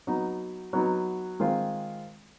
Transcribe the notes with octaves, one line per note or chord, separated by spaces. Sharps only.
F#3 B3 D#4
F#3 B3 D#4
D#3 G#3 C4 F4